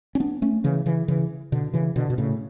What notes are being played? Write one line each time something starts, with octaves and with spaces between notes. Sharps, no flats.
C#4
B3 D4
A3 C#4
C#3 E3
C#3 E3
C#3 E3
B2 D3
C#3 E3
B2 D3
B2
A2 C#3